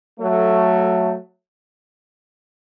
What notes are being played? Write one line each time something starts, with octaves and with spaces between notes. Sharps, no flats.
F#3 A3